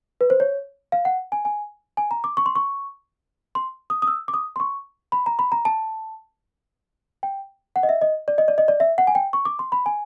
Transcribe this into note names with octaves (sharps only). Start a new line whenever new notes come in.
B4
C5
C#5
F5
F#5
G#5
G#5
G#5
A#5
D6
C#6
C6
C#6
C6
D#6
D#6
E6
D6
D#6
C6
C#6
B5
A#5
B5
A#5
A5
G5
F#5
D#5
E5
D#5
D5
D#5
D5
D#5
D5
E5
F#5
G#5
G5
C#6
D6
C6
B5
G#5